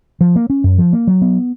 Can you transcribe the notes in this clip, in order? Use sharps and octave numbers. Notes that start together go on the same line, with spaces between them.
F3
A#3
C#4
F#2
F3
A#3
F#3
B3